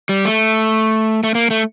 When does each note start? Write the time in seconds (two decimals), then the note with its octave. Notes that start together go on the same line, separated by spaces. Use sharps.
0.09 G3
0.25 A3
1.24 A3
1.35 A#3
1.51 A3